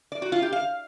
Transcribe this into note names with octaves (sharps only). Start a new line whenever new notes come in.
D5
F#4
F4
G4
F5